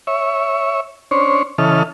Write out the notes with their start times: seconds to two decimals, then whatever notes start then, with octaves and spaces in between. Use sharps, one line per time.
0.07 C#5 E5
1.11 C#4 D4 C5 C#5
1.58 C#3 E3 A4 D#5 F6